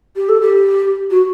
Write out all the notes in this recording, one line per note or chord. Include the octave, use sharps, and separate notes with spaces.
G4
A4
G4
F#4